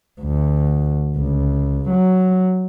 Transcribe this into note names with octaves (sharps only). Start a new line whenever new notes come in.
D2
C#2
F#3